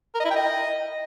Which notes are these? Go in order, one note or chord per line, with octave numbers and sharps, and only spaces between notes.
A#4
D#5
E4
G5
D#5